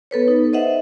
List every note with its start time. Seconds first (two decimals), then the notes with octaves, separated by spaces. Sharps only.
0.11 B3 A4 B4 C#5
0.28 D#4
0.53 C5 D#5 E5 F#5